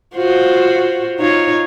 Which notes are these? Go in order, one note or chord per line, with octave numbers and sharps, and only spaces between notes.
F4 F#4 C5
D#4 F4 C#5